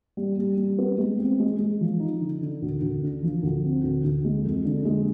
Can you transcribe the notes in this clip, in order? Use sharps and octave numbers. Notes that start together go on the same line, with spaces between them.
G3
G3
G3
B3
G#3
C4
G#3
G#3
F3
D#4
D3
D3
D2
D2
D3
F3
D2
C4
D2
D2
G#3
F2
D3
G#3